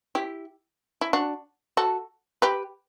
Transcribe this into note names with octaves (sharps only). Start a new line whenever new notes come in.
E4 G4
E4
D4 F#4
F#4 A4
G4 B4